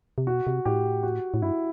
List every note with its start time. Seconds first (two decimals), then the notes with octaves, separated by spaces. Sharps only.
0.18 C3
0.27 B2 F#4
0.47 C3
0.65 A2 G4
1.03 F#4
1.34 A2
1.42 G2 E4